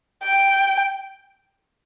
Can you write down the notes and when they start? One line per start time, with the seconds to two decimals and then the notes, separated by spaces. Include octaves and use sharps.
0.23 G5